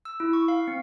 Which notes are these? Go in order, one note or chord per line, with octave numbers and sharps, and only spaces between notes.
E6
E4
C#6
F5
C4